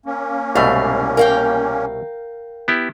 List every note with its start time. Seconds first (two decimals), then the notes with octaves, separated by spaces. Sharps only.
0.06 A#3 C#4
0.55 C2 G#2 B2 A3 F5
1.17 A#4 F5 G5
2.68 B3 E4 G4